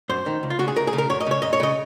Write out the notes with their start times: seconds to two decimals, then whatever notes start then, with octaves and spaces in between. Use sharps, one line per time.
0.09 F#2 C5
0.26 D#3
0.43 C#2
0.50 F4
0.59 C#3 F#4
0.68 G#4
0.76 C#2 A#4
0.87 G#4
0.93 C#3
0.98 A#4
1.10 F#2 C#5
1.20 D#5
1.26 C#3 C#5
1.42 F#2 D#5
1.53 C#5
1.60 C#3 D#5